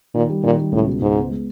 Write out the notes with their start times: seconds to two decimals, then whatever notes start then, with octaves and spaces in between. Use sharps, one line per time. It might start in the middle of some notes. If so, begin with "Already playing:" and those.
0.14 A#2 D#3
0.30 G3
0.44 A#2 D#3
0.58 G3
0.72 C#2 A2
0.87 B2
1.01 C#2 G#2
1.16 B3
1.30 G#3